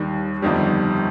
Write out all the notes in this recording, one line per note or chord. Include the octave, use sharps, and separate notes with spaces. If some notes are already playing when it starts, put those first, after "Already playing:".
Already playing: D#2 D#3 G3
G1 F2 D#3 G3